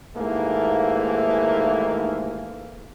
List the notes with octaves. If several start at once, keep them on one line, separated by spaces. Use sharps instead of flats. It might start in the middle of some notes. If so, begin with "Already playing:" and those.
D#2 G#2 E3 A3 A#3